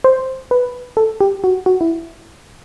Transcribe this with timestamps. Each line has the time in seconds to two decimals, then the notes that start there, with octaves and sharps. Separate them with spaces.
0.04 C5
0.51 B4
0.97 A4
1.21 G4
1.44 F#4
1.66 F#4
1.81 E4